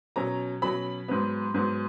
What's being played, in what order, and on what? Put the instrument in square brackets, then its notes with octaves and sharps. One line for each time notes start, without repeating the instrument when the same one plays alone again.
[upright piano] B2 F#3 C#4 A#5
B2 F#3 C#4 B5
G#2 F#3 B3
G#2 F#3 B3